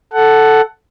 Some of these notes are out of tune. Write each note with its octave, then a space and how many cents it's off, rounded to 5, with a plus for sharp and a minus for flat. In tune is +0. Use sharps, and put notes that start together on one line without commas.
A4 +0 F#5 +10